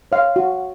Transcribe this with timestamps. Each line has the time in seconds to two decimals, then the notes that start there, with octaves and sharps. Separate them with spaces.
0.12 C#5 F5
0.36 F#4